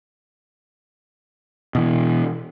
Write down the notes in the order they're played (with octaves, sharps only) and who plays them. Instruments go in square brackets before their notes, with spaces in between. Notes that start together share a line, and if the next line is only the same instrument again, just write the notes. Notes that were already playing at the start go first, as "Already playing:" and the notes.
[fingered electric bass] B2 E3